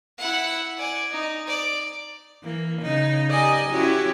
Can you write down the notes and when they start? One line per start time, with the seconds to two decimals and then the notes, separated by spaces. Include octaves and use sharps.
0.19 E4 F#5
0.78 D5 G#5
1.11 D#4
1.47 D5
2.43 E3 A#3
2.82 C#3 D#4
3.30 G4 A#4 D5 D#5 G#5
3.71 C#4 E4 F#4 G4